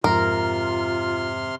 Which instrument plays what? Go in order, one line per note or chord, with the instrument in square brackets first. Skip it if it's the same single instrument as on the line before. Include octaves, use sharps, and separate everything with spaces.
[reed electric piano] F2 G#2 A#5 [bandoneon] C3 C6 F6 [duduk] F4 [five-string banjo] A#4